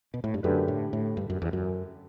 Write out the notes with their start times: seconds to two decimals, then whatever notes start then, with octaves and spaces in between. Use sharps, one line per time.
0.14 B2
0.24 A2
0.34 G2
0.43 F#2 D3 A3 D4 G4 B4
0.68 A2
0.93 A2
1.17 G2
1.30 F#2
1.42 E2
1.53 F#2